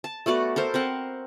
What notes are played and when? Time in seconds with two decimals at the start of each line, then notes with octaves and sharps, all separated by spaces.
0.04 A5
0.26 A3 B3 F#4 D5
0.56 A4 A#4 C5
0.74 C4 A#4 F#5